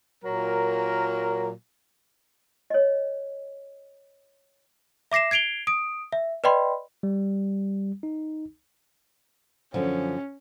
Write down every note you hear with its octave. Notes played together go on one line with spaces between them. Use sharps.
A#2 F#3 A#4
C#5 D#5
E5 D6 A#6 C7 E7
G#6 C7 D7 F7 G7
D#6 D7
E5
B4 D5 D#5 G5 B5 C6
G3
D#4
F#2 D3 F3 C#4